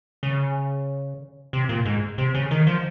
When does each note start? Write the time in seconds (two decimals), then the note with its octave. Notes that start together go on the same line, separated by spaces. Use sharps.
0.23 C#3
1.53 C3
1.69 A#2
1.85 G#2
2.18 C3
2.34 C#3
2.51 D#3
2.67 F3